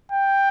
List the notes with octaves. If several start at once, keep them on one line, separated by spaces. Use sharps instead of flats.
G5